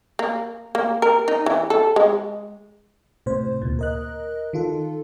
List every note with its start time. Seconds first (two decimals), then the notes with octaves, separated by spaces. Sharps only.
0.19 A#3
0.75 A#3
1.02 A#4
1.28 D#4
1.46 E3
1.70 A4
1.96 G#3
3.26 A2 C3 C5
3.62 D2 A#2
3.79 A#4 D#5 F#6
4.53 D#3 F4 A4